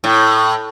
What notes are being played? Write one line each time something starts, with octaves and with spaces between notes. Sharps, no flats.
A2